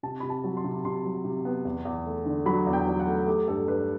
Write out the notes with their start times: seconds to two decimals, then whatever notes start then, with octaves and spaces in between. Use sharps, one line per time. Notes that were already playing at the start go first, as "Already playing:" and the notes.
0.03 C3 A5
0.20 C3 B5
0.30 A5
0.44 F#3
0.57 C6
0.64 C3
0.85 C3 C6
1.05 F#3
1.25 C3
1.45 B3
1.65 E2
1.85 E2
2.06 A3
2.25 D3
2.46 F#3 B5
2.67 E2
2.73 G5
2.87 F#3
3.00 F#5
3.07 A3
3.26 A3 G4
3.48 G2 A4
3.68 G2 B4